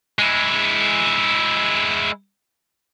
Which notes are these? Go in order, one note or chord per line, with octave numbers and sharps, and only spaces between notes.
G#3 E4